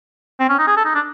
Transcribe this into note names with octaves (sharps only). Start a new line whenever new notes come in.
C4
C#4
D#4
G#4
A4
D#4
D4